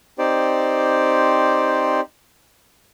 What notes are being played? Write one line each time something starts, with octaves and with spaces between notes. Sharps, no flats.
C4 D#4 G4 C5 D5